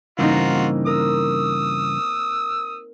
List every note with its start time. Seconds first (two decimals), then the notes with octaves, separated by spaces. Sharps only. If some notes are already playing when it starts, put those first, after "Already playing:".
0.19 G2 C#3 E3 A#3 C4 D#4 F4 F#4
0.87 A#4 D#6 E6